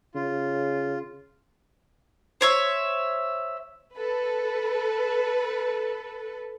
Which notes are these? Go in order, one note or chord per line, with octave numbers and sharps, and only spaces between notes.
C#3 F4
C5 C#5 E5
A4 B4